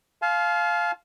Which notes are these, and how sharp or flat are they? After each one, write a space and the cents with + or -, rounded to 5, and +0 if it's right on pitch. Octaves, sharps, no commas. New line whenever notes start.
F5 +0 A5 -40 C6 +10